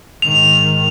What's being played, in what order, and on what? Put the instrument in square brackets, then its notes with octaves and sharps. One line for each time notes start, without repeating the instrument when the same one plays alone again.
[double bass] G#2 D#3 [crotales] F7